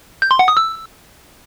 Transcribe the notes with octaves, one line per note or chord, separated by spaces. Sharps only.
G6
C6
F#5
D#6
E6